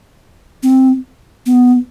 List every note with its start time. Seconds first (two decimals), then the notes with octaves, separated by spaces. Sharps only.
0.63 C4
1.46 B3